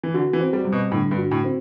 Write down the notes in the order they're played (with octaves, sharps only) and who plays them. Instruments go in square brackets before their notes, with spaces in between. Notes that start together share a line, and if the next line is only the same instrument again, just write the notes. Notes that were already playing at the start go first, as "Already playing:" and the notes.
[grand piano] E3
[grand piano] D3 [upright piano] F#4
[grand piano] E3
[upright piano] C4
[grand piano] G3
[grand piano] C3 [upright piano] G3
[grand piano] B2
[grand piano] A2 [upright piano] D3
[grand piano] G2
[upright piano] F#4
[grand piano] A2
[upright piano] C4